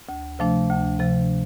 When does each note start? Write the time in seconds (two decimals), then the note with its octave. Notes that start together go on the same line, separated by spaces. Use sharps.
0.09 D2
0.39 C3 F3 A3 D4
0.70 D2
1.00 C3 F3